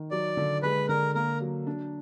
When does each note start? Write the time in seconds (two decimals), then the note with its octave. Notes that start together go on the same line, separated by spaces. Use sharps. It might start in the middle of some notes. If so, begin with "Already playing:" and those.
Already playing: D#3
0.11 F#3 D5
0.37 D3
0.63 G#3 B4
0.89 D3 A#4
1.15 A#3 A#4
1.41 F#3
1.67 D4